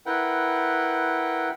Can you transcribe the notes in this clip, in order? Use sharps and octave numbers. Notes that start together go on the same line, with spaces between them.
E4 A#4 B4 F#5 G5